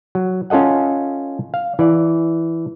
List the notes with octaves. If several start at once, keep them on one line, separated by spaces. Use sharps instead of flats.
F#3
C#4 F4 A4 D#5 F#5
F5
E3 D5